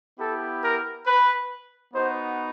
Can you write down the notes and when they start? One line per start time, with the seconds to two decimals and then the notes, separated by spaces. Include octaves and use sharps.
0.19 B3 E4 G4 A4
0.63 A#4
1.07 B4
1.94 B3 D#4 F#4 C5